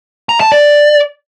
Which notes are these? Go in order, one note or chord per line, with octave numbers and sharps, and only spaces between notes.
A#5
A5
D5